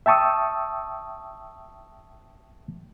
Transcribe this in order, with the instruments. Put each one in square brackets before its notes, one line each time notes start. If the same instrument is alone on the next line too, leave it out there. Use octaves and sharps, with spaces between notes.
[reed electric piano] E5 G5 A5 C#6 D#6 E6